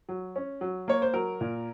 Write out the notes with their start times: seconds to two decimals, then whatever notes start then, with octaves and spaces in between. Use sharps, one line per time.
0.09 F#3
0.36 C#4
0.61 F#3
0.88 A#3 C#5
1.02 C5
1.13 F#3 A#4
1.41 A#2